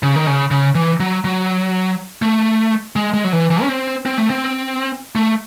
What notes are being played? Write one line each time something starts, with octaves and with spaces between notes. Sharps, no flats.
C#3
D#3
C#3
C#3
E3
F#3
F#3
A3
G#3
G#3
F#3
E3
E3
C#4
C4
C4
A3
C4
A3